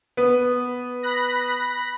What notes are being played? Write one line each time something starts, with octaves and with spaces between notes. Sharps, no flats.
B3
B5 F#6 A#6